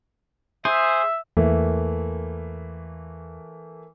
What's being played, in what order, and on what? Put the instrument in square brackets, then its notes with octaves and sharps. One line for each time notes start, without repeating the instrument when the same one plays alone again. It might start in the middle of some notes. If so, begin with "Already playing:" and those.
[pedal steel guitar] G#4 C5 [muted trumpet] E5
[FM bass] E2 [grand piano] E3 A3 A#3